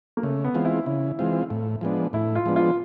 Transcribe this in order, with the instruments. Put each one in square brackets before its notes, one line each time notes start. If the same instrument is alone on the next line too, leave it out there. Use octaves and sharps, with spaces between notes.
[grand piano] A#3
[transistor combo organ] C#3 [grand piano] A3
[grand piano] B3
[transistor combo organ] E3 G#3 C4 F4
[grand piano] E4
[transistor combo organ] C#3 [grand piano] E4
[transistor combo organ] E3 G#3 C4 F4
A2
F3 G#3 B3 D4
[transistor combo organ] A2 [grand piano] E4
[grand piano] F4
[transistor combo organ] F3 G#3 B3 D4
[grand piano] F4